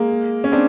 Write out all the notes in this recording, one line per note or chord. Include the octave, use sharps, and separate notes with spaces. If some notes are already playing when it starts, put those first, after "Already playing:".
Already playing: G#3 A#3
C#4
C4 D4